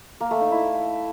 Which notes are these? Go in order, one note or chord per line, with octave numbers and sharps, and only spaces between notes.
A#3
A3
D#4
E4